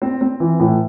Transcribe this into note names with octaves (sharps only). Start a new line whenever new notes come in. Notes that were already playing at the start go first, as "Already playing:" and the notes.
C4
C4
E3
A2